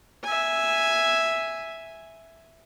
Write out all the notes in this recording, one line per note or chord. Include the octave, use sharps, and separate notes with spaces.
E5 G#5